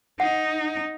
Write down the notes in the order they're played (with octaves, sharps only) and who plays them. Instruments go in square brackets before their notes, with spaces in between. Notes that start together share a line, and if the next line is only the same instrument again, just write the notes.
[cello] D#4 [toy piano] F#5